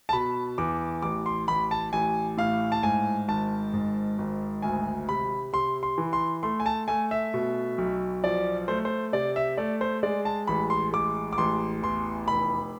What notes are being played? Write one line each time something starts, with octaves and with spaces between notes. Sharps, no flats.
A5
B2 B5
E2 D6
A1 D6
C6
A1 B5
A5
A1 G#5
A2 F5
A5
G#2 G#5
G#1 A5
G#2
G#1
D2 G#5
C3 B5
C3 C6
C6
E3
C6
A3 C6
G#5
A5
A3 G#5
E5
B2
B1
F3 D5
A3 C5
C5
C3 D5
E5
A3 D5
C5
G#3 D5
A5
A1 B5
C6
G#3 D6
D6
A1 C6
E2 C6
F1 B5